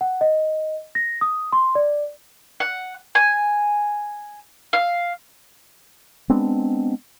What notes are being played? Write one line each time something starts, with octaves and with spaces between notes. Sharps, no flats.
F#5
D#5
A#6
D#6
C6
D5
F#5
G#5
F5
G#3 B3 C4 D4